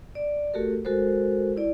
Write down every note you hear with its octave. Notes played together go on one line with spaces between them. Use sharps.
D5
A3 F#4 G4 A4 A#4
G#3 F#4 A4 A#4 C5
E4 D5